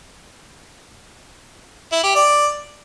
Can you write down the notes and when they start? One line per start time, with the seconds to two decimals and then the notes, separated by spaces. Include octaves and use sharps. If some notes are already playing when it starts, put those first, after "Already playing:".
1.92 E4
2.04 G4
2.15 D5